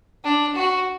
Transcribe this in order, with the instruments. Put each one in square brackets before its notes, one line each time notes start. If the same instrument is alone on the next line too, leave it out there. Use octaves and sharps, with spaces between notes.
[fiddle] D4
F#4